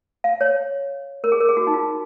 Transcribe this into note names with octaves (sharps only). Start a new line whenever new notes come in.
F5
C#5
A#4
G#4
A#4
G#4
F#4
D#4
F4